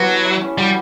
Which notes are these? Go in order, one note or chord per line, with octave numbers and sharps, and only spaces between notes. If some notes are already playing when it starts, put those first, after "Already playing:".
Already playing: F#3 B3 E4 G4
A4
E5
C#4
G3 F#4